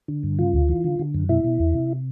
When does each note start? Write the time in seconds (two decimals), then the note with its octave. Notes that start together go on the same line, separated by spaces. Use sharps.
0.08 D3
0.23 G2
0.39 C#3 F4
0.54 D2
0.69 E3
0.84 D3
0.99 D3
1.14 F#2
1.29 B2 E4
1.44 B2
1.60 E2
1.74 C3